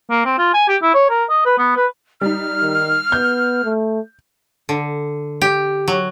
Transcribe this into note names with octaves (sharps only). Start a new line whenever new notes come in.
A#3
C4
F4
G#5
G4
E4
C#5
A#4
D#5
B4
B3
B4
G3 D#4 F6
D#3
B3 G6
A3
D3
G4
F#3